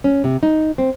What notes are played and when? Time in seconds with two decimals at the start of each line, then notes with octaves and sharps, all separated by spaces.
0.04 C#4
0.24 C3
0.43 D#4
0.78 C4